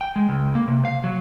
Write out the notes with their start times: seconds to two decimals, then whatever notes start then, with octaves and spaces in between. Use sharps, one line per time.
0.01 G5
0.16 G#3
0.29 C#2
0.55 A#3
0.68 C3
0.85 F5
1.04 F#3